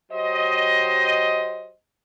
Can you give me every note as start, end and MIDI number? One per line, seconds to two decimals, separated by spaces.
0.11 1.71 54
0.11 1.71 67
0.11 1.71 72
0.11 1.71 75